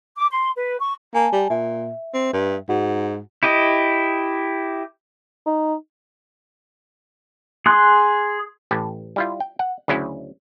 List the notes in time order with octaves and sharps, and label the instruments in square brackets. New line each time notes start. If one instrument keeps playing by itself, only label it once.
[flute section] D6
C6
B4
C#6
[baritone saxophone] A#3 [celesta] G#5 A5
[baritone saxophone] G3
[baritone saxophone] A#2 [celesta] E5
[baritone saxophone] C4
G2
[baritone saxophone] G#2 [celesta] F#4 F#5
[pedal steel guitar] E4 G4 D#5
[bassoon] D#4
[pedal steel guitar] G#4 C6 F#6
[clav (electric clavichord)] A1 A2 G4 A5
G3 E4 F4
G5
F#5
D2 C#3 F#3 C#4 E4